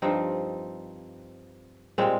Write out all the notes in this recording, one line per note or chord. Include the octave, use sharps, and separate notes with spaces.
G2 F3 C4 D#4
A#2 G3 G#3 C4